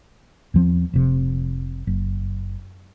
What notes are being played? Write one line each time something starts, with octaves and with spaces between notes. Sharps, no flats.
E2 F3 C4
F1 C3
F#1